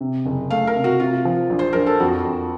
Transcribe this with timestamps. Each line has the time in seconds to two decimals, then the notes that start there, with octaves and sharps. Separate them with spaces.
0.01 C3
0.26 F#1
0.50 A3 F5
0.67 A#4
0.76 C3
0.84 F#4
1.00 C3 F4
1.25 F3
1.50 A#1
1.59 C5
1.73 A#1 A#4
1.86 A4
2.00 F2 F#4
2.25 F2